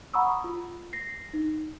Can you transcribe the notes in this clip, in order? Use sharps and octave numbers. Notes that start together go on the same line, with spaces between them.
F#5 A#5 B5 C#6 D#6 E6
F4
A#6 C7
D#4